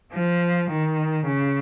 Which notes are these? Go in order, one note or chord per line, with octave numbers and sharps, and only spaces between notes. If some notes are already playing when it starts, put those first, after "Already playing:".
F3
D#3
C#3